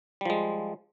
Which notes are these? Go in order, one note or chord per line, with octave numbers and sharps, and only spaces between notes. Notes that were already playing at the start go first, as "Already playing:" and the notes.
F3 G3 G#3